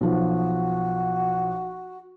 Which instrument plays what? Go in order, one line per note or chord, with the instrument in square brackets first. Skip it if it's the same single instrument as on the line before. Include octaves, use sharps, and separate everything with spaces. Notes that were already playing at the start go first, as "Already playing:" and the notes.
[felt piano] B1 F3 [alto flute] F#4